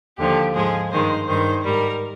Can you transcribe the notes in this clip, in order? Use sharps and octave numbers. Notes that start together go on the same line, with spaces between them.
D#2 D3 F3 G4
G#2 F3 G#3 G#4
G2 D#3 G#3 C5
G2 D#3 G#3 C5
G#2 G3 A#4